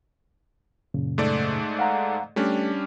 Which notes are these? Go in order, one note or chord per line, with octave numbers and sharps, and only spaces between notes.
F#2 A#2 C#3
G#2 A3 D5
F5 F#5 A#5
G3 A3 C#4 D4 G4